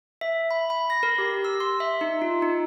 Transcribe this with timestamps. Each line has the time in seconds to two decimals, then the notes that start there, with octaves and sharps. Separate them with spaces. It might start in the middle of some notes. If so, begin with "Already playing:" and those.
0.21 E5
0.51 B5
0.70 B5
0.90 A#6
1.03 A#4
1.18 G4
1.45 E6
1.60 C6
1.80 E5
2.01 D#4
2.22 F4
2.42 D#4